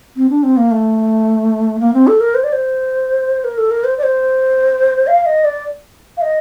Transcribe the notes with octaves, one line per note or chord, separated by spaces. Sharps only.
C4
D4
C4
A#3
A3
A#3
C4
A4
A#4
C5
D5
C5
A#4
A4
A#4
C5
D5
C5
F5
D#5
D5
F5
D#5